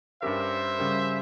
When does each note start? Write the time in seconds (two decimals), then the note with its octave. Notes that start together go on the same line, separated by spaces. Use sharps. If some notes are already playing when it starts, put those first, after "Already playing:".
0.22 G2 G3 C#4 G4 A#4 C5 E5
0.78 C#3 G3 C#4 G4 A#4